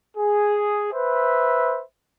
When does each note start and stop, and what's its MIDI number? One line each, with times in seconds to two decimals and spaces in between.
0.17 0.87 68
0.92 1.81 71
0.92 1.81 72
0.92 1.81 76